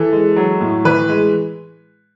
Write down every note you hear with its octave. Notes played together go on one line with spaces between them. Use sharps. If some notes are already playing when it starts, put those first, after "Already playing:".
Already playing: E3 A4
G#3
F#3
A2
E3 B4
G#3